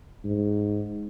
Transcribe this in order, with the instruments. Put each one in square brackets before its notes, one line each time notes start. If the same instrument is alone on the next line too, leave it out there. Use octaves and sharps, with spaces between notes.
[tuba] G#2